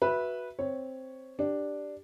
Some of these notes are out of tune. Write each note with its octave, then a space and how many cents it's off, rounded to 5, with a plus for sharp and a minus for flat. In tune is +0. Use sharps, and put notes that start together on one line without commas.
F#4 +0 B4 -10 E5 +0
C4 +0 C#5 +0
D4 +0 G4 +0